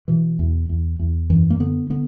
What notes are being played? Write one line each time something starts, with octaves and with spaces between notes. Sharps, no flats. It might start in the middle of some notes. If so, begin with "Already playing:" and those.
B2 E3
E2
E2
E2
F#2 E3
A#3
D3 B3
D3 B3